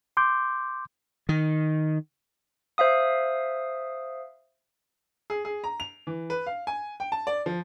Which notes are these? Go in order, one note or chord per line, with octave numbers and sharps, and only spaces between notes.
C6 D6 G6
D#3
C5 E5 F5 D#6
G#4
G#4
A#5
F7
E3
B4
F5
G#5
G5
A5
D5
F3